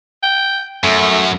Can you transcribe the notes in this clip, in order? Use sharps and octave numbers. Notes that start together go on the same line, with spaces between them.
G5
F#2 A3